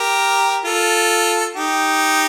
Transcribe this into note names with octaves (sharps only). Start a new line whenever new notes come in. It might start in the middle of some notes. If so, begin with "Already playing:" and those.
Already playing: G4 A#4
F4 A4
D#4 G4